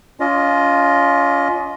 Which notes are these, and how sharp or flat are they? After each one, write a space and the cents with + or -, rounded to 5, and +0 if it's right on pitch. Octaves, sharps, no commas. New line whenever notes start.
C#4 +35 F4 +0 D#5 +0